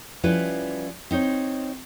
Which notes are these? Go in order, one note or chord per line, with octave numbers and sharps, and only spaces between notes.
F3 G3 C#4 E4 B4
C4 D#4 C5 C#5